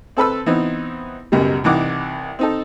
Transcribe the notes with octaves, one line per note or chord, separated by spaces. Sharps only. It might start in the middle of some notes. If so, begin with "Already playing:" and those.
C4 A4 B4 E6
E3 B3 C4 D#4
C#2 F#2 B2 G3
C2 E3 D#4 F#5 D6
C4 D#4 A4